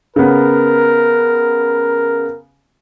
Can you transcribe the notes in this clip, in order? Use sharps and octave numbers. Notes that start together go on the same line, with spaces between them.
C#3 B3 A#4